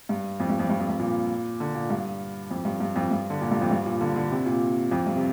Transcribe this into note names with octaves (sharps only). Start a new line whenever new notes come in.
G2
F2
G2
F2
G2
F2
G2
A#2
D3
A#2
G2
F2
G2
G2
F2
G2
D3
A#2
G2
F2
G2
A#2
D3
D3
C3
A#2
F2
G2
C3